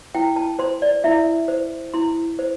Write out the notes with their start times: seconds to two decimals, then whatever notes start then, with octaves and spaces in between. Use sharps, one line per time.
0.15 E4 G5
0.36 A5
0.59 C5 C6
0.82 D5
1.04 E4 E5
1.48 C5
1.94 E4 C6
2.39 C5